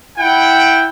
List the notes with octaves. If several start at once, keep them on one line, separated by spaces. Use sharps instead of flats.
E4 F#5 G5